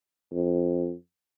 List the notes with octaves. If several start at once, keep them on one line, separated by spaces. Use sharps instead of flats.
F2